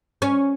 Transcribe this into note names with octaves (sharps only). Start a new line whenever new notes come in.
C#4